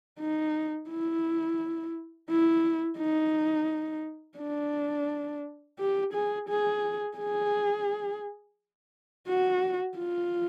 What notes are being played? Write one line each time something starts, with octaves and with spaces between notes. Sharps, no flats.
D#4
E4
E4
D#4
D4
G4
G#4
G#4
G#4
F#4
F4